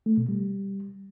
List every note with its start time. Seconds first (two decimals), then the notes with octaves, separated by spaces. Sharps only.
0.06 A3
0.17 B2
0.29 G3